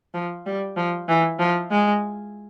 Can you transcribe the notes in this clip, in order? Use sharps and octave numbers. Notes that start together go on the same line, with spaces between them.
F3
G3
F3
E3
F3
G#3